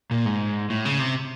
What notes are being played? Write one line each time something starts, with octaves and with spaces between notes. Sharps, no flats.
A#2
G#2
A2
C#3
C3